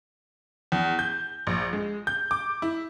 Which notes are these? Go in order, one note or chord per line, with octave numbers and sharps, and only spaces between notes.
E2
G6
A#1
G#3
G6
D6
E4